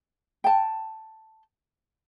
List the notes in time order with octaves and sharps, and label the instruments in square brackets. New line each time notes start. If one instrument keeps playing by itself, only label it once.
[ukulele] G5 A5